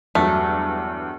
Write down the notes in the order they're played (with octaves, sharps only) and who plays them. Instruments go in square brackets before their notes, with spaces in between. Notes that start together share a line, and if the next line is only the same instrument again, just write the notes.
[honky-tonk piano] E2 G2 F#3 [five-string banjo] A3